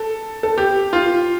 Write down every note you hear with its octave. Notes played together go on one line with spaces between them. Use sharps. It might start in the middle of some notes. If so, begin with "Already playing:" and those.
Already playing: A4
A4
G4
F4